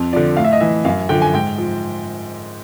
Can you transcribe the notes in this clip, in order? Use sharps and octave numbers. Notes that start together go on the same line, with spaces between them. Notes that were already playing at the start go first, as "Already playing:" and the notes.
Already playing: F2
D3 F3 D5
A2 F5
E5
D#5
E3 E5
F#2 F5
D3 F3 G5
G#5
G#2 G5
F3